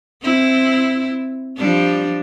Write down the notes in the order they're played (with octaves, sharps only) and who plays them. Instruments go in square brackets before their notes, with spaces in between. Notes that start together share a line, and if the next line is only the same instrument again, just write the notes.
[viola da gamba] C4 E4
F3 G3 D4